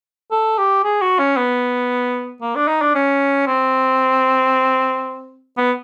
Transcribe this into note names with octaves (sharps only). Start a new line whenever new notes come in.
A4
G4
G#4
F#4
C#4
B3
A#3
D4
D#4
D4
C#4
C4
B3